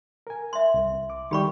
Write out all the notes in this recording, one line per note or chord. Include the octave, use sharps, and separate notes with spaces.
A#4 G#5
E5 C6
C2
D6
D#3 G3 G4 G5 B5 C#6